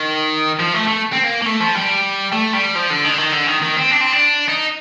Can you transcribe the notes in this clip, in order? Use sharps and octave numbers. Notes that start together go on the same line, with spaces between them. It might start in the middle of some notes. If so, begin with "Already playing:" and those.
Already playing: D#3
F3
A3
A3
C4
A#3
A#3
A3
F3
G3
A3
G3
F3
D3
D#3
D3
D#3
D3
D#3
D#3
C4
D4
C4
D4
D#4